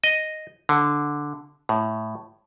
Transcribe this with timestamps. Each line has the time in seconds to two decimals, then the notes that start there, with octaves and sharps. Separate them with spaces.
0.04 D#5
0.69 D3
1.69 A2